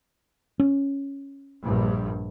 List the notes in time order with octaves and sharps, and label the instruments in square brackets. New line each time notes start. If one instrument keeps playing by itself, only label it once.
[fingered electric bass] C#4
[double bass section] A#1 G2